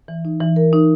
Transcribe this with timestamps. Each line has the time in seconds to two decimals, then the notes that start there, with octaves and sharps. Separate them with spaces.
0.08 E3
0.25 D#4
0.41 E3
0.56 A#4
0.73 D#4